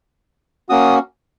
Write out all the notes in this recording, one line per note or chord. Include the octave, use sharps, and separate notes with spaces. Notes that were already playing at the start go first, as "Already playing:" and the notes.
A#3 C#4 F#4 D#6